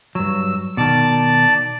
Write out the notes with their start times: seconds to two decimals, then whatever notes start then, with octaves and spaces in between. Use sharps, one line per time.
0.15 G2 F#3 E6
0.77 B2 D#3 D5 A5